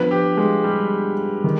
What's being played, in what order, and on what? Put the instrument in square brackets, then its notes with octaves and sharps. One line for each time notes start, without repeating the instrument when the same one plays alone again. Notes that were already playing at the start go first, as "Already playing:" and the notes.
Already playing: [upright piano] F3 B3 D4 F4 [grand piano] B4
[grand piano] G4
G#3
G3
[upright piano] D#3